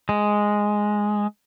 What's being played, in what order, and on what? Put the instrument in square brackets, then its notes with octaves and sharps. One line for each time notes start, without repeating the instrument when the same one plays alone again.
[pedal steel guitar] G#3